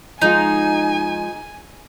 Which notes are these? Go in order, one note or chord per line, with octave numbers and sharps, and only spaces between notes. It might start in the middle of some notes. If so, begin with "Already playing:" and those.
F3 G#3 D#4 F4 G#5